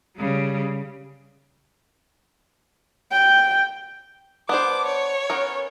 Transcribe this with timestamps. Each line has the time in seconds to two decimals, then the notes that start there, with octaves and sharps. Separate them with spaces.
0.17 C#3 G3
3.11 G5
4.49 B3 D4 C5 D6
4.86 C#5
5.30 B3 C#4 A#4